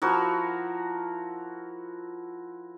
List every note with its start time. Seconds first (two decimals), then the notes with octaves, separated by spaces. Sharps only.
0.02 F3 E4 F#4 A#4